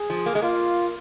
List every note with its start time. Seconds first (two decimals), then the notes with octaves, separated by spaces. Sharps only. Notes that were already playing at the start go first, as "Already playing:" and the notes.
Already playing: G#4
0.10 F3
0.26 A#3
0.35 G#3
0.42 A#3 F4